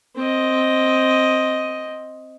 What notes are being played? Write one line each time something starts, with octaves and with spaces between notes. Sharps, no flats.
C4 D#5